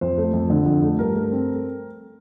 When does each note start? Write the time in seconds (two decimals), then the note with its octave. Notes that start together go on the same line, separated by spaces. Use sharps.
0.01 F2 C5
0.18 A3
0.34 F2
0.50 D3
0.66 F2
0.83 A3
0.99 G2 A#4
1.15 A3
1.31 C4